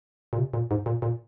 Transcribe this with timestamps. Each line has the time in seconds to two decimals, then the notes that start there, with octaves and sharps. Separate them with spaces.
0.33 A#2
0.38 C3
0.53 A#2
0.71 G#2
0.86 A#2
1.02 A#2